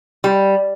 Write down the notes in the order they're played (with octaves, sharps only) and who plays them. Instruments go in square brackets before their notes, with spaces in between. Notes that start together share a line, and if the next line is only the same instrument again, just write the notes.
[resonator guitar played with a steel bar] G3